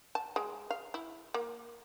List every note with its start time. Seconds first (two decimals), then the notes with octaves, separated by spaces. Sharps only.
0.15 A5
0.36 G#3
0.71 F5
0.94 E4
1.34 A#3